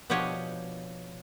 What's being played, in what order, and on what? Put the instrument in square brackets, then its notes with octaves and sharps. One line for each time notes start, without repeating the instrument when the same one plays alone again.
[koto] B2 F3 D4 G4 C#5 D#5